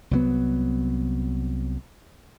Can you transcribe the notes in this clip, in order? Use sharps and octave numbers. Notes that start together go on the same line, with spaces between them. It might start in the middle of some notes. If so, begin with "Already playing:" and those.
C2 F#3 B3